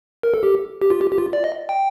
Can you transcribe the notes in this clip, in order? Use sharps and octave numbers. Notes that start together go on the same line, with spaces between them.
A#4
A4
G4
G4
F4
G4
G4
F4
D5
D#5
G5